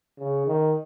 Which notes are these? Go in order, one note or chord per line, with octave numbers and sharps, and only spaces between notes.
C#3
D#3